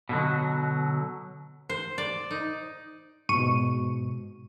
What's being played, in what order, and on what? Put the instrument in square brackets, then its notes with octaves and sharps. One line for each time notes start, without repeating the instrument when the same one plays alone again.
[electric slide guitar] B2 D3 F#3
[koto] C5
D5
D#4
[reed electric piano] G#2 B2 [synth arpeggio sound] C#6 D#7